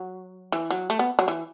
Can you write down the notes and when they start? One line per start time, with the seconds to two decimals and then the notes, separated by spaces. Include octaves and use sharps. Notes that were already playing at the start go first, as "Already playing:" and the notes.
Already playing: F#3
0.52 E3
0.71 F#3
0.90 A3
0.99 B3
1.19 F#3
1.28 E3